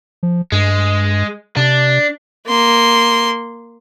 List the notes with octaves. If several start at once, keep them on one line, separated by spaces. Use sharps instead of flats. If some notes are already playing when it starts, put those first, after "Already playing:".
F3
G2 G#3
C3 D4
A#3 C6